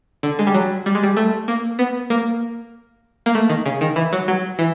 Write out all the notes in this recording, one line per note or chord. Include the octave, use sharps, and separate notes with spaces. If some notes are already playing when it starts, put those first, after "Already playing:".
D3
G#3
G3
F#3
G3
G#3
G3
A3
A#3
B3
A#3
A#3
A3
D#3
C#3
D#3
E3
F#3
F#3
E3